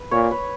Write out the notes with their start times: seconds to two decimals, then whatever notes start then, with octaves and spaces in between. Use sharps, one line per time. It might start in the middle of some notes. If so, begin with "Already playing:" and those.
Already playing: B4
0.11 A#2 C#5
0.31 B4